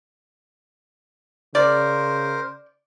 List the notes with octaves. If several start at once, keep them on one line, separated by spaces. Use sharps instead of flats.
C#3 A#4 C5 D5